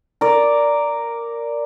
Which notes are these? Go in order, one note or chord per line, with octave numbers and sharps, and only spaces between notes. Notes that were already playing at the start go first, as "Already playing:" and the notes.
A#4 D5